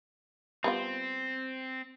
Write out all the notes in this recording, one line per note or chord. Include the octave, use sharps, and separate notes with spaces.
G3 B3 C4 F4